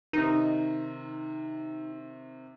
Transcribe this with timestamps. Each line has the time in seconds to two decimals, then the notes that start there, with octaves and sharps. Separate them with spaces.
0.13 C3 D#3 D#4